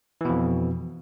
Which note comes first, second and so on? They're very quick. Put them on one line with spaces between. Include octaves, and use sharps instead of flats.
E3 B2 F2